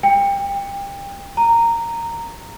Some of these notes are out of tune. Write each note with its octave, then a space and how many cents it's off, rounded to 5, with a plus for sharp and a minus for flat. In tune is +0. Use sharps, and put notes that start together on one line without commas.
G5 +25
A#5 -10